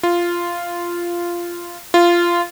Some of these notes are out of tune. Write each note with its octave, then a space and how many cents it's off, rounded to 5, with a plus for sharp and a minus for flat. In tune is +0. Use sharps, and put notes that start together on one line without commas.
F4 -10
F4 -15